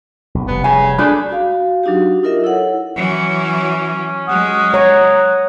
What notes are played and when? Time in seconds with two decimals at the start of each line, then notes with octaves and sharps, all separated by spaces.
0.35 B1
0.48 F1 G3 B3
0.64 C#3 G#5
0.98 A3 D4 G#4 B5
1.30 F#4 F5
1.83 F#3 D4 D#4 F#4 G4
2.23 D#4 F4 A#4 D#5 E5
2.44 E4 A4 C#5 F#5
2.96 E3 F#3 C#4
4.28 F#3 G#3 F#5 D#6
4.74 C#5 A#5